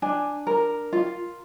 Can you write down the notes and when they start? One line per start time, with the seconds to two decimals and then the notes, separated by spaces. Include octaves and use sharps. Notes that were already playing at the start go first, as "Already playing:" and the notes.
0.02 D4 G#5
0.47 A#4
0.93 F4